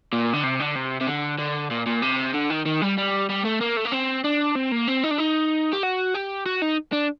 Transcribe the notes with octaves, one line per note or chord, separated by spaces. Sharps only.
A#2
D3
C3
D3
C3
C3
D3
D3
A#2
A#2
C3
D3
D#3
D#3
G3
G3
G3
A3
A#3
A3
A#3
C4
D4
C4
A#3
C4
D#4
D4
D#4
G4
F#4
G4
F#4
D#4
D4